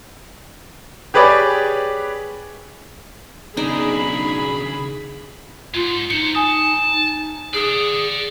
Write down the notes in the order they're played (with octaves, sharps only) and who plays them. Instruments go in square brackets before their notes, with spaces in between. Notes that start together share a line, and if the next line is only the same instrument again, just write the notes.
[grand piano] G4 G#4 B4 C#5 D5
[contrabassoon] B1 [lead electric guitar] C#3 D4 [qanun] D#4 [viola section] G#4 B5
[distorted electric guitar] G#2 [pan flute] F4
[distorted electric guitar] D4 C5 [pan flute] D#4 [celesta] C#7
[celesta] G#5 D#6 [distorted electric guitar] A5
[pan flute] G#4 [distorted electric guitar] D5 F#5